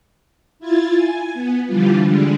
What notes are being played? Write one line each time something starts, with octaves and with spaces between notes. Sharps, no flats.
E4 F4 G#6 A6
G#5
B3
D3 E3 F3 G3 F4
D3 G3 G#3 D4